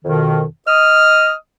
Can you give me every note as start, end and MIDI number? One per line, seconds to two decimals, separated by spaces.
0.05 0.44 41
0.05 0.44 47
0.05 0.44 51
0.67 1.34 75
0.67 1.34 87
0.67 1.32 89